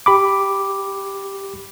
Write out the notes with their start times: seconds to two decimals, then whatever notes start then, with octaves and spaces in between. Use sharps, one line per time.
0.06 G4 B5 D6